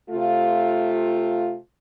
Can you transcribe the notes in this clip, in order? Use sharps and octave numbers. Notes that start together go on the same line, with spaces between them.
C3 A3 F4